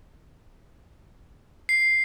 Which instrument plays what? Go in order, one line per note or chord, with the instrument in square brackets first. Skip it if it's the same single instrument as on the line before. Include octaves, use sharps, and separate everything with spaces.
[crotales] C7